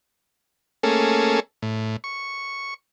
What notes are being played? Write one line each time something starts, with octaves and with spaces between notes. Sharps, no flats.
A3 A#3 C#4 G#4 A4
A2
C#6